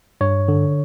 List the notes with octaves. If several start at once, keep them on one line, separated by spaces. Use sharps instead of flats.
G2 C#5
D3